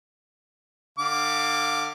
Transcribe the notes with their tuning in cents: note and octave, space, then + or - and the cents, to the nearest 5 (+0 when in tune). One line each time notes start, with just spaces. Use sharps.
D3 +30 F5 +0 D6 +0